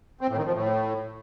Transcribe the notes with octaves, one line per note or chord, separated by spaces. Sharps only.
C4
A2
D#3
F3
A2